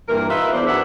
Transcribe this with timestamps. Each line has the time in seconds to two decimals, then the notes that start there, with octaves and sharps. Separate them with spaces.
0.09 G2 A#2 E3 A#4
0.30 D#4 F4 B4 E5
0.52 E2 D4 C5
0.67 F#2 D#3 B3 D4 E5 F#5